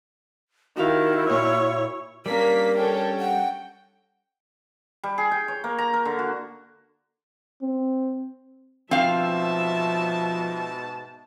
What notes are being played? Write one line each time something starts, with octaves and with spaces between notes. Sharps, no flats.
D#3 E4 F#4 G4 F5
A#2 C#5
G3 A#3 C#4 D4 A#4 B6
C#4 A4 G5
F#5 G5
G3
G#4
G5
C#5
A#3
A#5
A#4
D3
F#4
C4
G#2 B2 F3 C4 E5 F5 A5